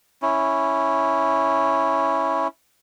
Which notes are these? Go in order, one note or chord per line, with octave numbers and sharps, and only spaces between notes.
C#4 E4